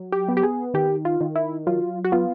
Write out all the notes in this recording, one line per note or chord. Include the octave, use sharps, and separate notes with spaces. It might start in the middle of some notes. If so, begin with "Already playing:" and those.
Already playing: F#3
G4
B3
G4
G#4
D#3 G4
F4
D#3
E4
F#3 F4
F#4
B3 F4